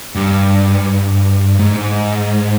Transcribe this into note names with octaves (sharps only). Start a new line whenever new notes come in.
G2
G#2